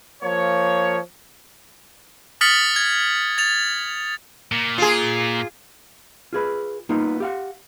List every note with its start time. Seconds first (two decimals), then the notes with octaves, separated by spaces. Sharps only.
0.23 F3 A#3 C#5
2.41 D#6 F6 A6 B6 C#7 F#7
2.76 G#6
3.38 A6 F7
4.51 A#2
4.78 F4 G#4
6.33 F4 G#4 B4
6.89 A#3 B3 D#4 F4
7.20 G4 F5 F#5